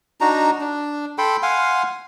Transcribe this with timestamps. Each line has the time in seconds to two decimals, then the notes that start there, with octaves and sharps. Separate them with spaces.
0.21 D4 D#4 F#4 A#5
0.61 D4
1.18 A4 G5 B5 C6
1.43 F5 F#5 G#5 C6